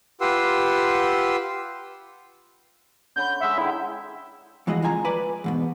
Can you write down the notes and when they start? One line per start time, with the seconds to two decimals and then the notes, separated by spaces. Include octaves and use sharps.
0.21 F4 G4 B4 F#5 C6 E6
3.16 D3 C#4 B5 G6
3.41 G#3 E5 F#5
3.58 D3 D#3 E4
4.67 D2 E3 F3 G#3 F#4 D#5
4.82 F2 G#3 F4 G#5 A#5
5.05 B4 D5 G#5 B5
5.44 E2 G#2 B2